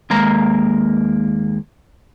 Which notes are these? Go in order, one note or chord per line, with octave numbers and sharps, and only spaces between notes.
D#2 G#3 A#3 A#5